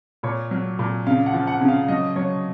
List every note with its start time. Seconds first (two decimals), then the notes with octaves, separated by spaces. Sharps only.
0.23 A#2 C#5
0.51 F#3
0.79 A#2
1.07 C#3 F5
1.26 F#5
1.34 F3
1.47 F#5
1.61 C#3
1.68 F5
1.88 F#3 D#5
2.16 F#3 C#5